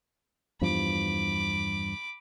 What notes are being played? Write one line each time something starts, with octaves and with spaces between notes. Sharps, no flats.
E2 G2 F3 B5 D6